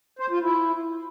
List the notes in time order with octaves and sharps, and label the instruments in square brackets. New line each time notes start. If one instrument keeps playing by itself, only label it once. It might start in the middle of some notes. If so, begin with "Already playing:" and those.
[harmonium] C5
F4
E4